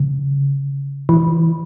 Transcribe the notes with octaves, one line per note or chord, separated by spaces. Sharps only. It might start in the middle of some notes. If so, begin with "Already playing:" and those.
Already playing: C#3
E3